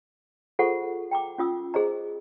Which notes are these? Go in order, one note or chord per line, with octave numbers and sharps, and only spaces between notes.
F4 G#4 A4 C5 F#5 C#6
G5 A#5 D6
C#4 F4 D#6 E6
G#4 C5 D#5 A#5